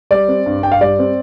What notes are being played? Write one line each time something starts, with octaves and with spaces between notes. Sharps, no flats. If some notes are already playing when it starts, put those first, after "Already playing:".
G3 D5
C4
G2
G2 G5
F5
G3 D5
C4